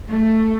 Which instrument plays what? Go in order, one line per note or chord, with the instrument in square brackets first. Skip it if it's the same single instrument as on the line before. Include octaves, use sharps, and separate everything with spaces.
[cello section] A3